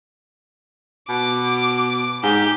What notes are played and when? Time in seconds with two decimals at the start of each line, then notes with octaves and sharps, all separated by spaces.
1.09 B2 D6
2.23 G#2 G4 G6